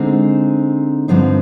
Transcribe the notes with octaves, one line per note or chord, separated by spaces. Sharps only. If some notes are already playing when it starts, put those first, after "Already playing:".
Already playing: D3 G#3 C4 D#4
G2 D3 F3 C4 D#4